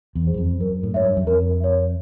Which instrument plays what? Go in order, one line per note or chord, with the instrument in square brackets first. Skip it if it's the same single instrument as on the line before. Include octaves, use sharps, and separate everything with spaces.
[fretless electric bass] E2
[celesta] G#4 C5
[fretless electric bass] F#2
F2
[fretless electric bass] F#2 [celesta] A#4
[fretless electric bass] A2
[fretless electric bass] G#2 [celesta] C#5 E5
[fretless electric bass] G2
F#2
[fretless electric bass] F2 [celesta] A#4
[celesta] C#5 E5